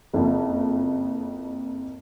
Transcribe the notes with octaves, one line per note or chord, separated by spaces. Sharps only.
F#1 F2